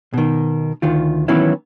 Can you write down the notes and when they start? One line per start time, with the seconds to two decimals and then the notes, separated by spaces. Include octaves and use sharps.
0.14 B2 D#3
0.82 D2 D#3 F4
1.28 D#3 E3 F#3 B3 C#4 E4